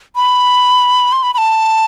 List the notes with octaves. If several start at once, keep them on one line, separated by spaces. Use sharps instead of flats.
B5
C6
B5
B5
A5